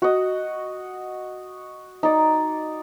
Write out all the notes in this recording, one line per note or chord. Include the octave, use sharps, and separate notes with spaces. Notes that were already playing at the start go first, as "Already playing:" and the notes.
F#4 D#5
D#4 D5